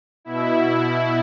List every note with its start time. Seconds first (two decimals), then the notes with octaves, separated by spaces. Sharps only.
0.25 B2 E4